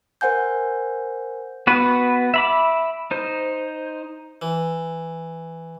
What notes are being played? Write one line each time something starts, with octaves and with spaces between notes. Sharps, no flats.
A#4 C5 F#5 G#5 G6
B3 F#4 B4
E5 B5 D6
D#4 C5
E3